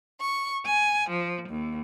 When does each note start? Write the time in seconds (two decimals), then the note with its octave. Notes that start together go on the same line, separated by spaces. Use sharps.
0.21 C#6
0.64 G#5
1.08 F3
1.48 D#2